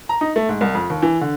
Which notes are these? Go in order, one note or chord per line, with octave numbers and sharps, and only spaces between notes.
A#5
D#4
A3
G#2
C2
F2
D#2
E3
D3